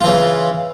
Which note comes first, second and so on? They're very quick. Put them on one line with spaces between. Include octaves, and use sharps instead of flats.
F4 E3 C#3